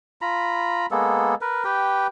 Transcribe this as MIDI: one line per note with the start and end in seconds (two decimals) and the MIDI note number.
0.22 0.86 65
0.22 0.86 82
0.22 0.86 83
0.91 1.35 56
0.91 1.35 58
0.91 1.35 59
0.91 1.35 69
1.41 1.65 70
1.41 1.65 71
1.65 2.07 67
1.65 2.07 71
1.65 2.07 79